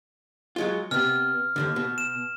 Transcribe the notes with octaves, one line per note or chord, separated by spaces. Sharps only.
F#3 G#3 F4
C3 B3 F6
D#2 G#2 D3
B2
E7